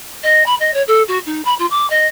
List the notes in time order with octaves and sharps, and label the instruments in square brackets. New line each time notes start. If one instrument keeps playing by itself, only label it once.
[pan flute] D#5
B5
D#5
C#5
A4
F#4
D#4
B5
F4
D6
D#5